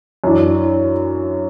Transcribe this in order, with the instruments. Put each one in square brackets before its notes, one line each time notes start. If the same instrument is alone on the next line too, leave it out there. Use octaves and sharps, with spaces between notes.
[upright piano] F#2 E3 D4